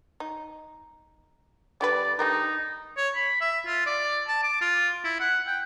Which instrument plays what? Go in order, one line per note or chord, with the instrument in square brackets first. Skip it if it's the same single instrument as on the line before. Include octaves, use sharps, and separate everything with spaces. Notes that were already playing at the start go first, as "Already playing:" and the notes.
[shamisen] D#4
[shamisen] D3 G3 B4 [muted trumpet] D5
[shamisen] D3 G3 A#4 [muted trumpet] D#4
[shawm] C#5
B5
E5
F4
D5
A5
D6
F4
E4
F#5
G5